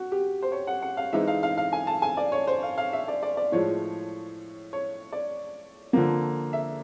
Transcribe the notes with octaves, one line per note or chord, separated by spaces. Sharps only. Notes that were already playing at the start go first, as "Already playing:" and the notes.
Already playing: F#4
G4
C5
C#5
F#5
F#5
F5
E3 G#3 C4 D#4 E5
F5
F5
F5
G#5
A5
G#5
D5
C#5
C5
F5
F5
E5
D5
D5
D5
A2 F3 G#3 C#5
C#5
D5
D3 F3 A#3
E5